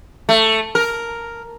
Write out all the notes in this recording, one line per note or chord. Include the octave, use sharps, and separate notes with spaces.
A3
A#4